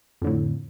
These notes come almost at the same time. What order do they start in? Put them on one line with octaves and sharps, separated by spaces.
F2 D3 A2